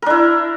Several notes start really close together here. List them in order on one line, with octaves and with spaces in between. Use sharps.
A#4 D4 E4